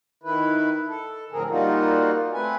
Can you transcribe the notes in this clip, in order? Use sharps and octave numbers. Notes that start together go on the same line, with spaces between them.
D#3 E4 B4
A4
F2 A2 D3 C4 G#4 A#4
G3 A#3 D#4 F4 F#4
A3 C4 B4 G#5